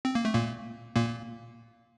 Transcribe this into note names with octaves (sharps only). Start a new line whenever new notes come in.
C4
A#3
A3
A#2 A#3
A#2 A#3